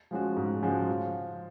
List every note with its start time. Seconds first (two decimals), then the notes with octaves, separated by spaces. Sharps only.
0.11 F3 G#3 C#4 F#4
0.37 G#2
0.63 F3 G#3 C#4 F#4
0.88 F3